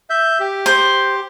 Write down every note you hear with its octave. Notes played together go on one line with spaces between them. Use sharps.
E5 G6
G4
C5